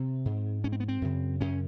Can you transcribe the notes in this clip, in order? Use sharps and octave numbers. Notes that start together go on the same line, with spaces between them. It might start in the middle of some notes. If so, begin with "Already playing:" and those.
Already playing: C3 C4
G#2
G#2 C#4
C4
B3
C4
F#2 C#3
F#2 C#3 C#4